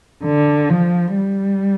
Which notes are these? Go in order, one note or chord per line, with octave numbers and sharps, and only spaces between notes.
D3
F3
G3